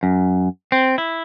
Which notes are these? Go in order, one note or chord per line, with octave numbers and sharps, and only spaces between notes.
F#2
C4
E4